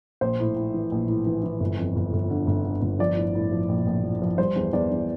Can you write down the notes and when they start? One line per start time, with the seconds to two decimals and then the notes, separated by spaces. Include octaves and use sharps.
0.21 A#1 C5
0.40 A2
0.56 A2
0.74 E3
0.92 A#1
1.08 A2
1.26 E3
1.44 E3
1.60 G1
1.78 F2
1.96 G1
2.13 G1
2.30 D3
2.47 G1
2.65 D3
2.82 G1
2.99 F3 D5
3.17 A2
3.35 A2
3.52 F3
3.69 A#1
3.87 A#1
4.04 F3
4.22 F3
4.38 G3 C5
4.56 E2
4.73 E2 D5
4.91 E2